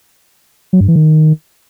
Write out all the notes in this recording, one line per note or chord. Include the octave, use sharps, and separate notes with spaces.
F#3
G2
E3
D#3